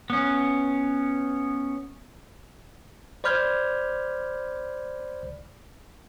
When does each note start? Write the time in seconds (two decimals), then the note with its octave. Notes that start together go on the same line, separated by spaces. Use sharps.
0.10 B3 C#4
3.24 C5 D5 B5 F6 G6 G#6